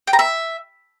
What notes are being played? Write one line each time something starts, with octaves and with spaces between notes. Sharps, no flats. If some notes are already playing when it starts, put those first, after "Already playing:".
G5
A#5
E5